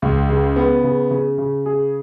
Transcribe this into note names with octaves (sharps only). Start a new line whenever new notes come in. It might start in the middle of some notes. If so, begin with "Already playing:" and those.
C#2
C#3
B3
C#3
C#3
C#3
G#4